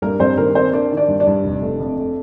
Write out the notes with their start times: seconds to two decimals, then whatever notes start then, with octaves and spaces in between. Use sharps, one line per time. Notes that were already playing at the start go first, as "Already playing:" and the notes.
0.02 G2 A#3 A#4
0.19 G2 C4 C5
0.37 D#3 A#3 A#4
0.55 A#3 C4 C5
0.73 A#3 D4 D5
0.92 D#3
0.97 D4 D5
1.08 G2
1.20 D4 D5
1.27 G2
1.44 F1
1.62 A3
1.80 F2
1.98 A3